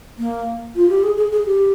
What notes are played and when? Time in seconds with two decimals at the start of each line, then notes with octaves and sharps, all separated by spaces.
0.18 A#3
0.76 F4
0.89 G4
1.03 G#4
1.17 G#4
1.32 G#4
1.46 G4